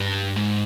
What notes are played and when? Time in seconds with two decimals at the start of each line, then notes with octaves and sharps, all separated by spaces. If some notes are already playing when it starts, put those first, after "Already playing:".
Already playing: G2
0.36 G#2